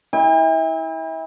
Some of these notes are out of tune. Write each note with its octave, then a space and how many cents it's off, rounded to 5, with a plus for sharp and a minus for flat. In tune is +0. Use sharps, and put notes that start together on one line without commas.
E4 -30 G5 +45